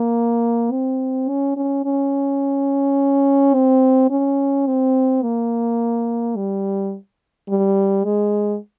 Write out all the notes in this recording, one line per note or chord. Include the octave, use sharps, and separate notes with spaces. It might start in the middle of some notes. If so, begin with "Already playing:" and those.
Already playing: A#3
C4
C#4
C#4
C#4
C4
C#4
C4
A#3
G3
G3
G#3